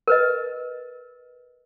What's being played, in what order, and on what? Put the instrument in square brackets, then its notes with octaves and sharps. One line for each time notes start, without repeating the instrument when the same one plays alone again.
[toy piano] A#4 B4 D#5